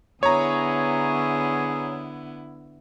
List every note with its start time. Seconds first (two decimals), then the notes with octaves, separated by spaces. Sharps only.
0.23 D3 B3 E4 G#4 C#5 A#5